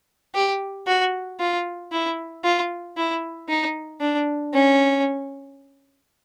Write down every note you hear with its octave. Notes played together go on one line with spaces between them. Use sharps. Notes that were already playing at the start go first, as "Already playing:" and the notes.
G4
F#4
F4
E4
F4
E4
D#4
D4
C#4